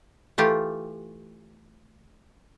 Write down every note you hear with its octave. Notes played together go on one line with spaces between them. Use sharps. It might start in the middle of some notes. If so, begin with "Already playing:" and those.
E3 A3 F4 G4